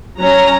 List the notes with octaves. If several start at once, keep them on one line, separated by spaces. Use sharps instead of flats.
F#3 C#4 A#5